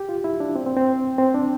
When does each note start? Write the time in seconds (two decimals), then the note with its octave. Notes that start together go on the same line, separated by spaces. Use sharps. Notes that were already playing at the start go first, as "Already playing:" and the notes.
Already playing: G4
0.09 F4
0.24 E4
0.40 D4
0.56 C4
0.66 C4
0.77 C4
1.18 C4
1.34 D4